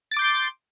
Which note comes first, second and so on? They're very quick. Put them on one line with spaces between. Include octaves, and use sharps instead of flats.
A6 D7 D6 G6 C6